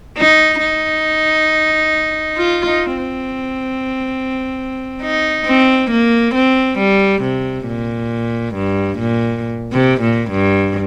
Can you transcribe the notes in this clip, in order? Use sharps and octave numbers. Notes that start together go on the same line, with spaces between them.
D#4
D#4
F4
D#4
C4
D#4
C4
A#3
C4
G3
C3
A#2
G2
A#2
C3
A#2
G2